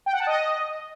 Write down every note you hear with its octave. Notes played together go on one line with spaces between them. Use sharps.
G5
F#5
A5
D#5